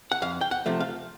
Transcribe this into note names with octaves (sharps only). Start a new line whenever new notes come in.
F#5
F2 F5
G5
F#5
C3 F3 A3
F5